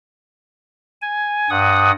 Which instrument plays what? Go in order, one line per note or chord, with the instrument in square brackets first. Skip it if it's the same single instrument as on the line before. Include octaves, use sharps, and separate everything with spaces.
[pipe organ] G#5
G2 F#5 D#6